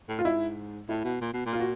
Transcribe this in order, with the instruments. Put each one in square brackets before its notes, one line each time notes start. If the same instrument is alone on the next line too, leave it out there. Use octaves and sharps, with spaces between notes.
[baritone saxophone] A2
[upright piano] F4
[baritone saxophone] G#2 [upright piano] E4
[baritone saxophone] A2 [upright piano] E4
[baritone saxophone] B2
A#2
B2
A#2
[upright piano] F4
F#4